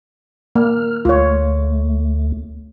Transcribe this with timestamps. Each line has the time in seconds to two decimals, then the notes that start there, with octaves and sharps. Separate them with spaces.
0.56 A#3 F6
1.05 D2 A3 F4 C#5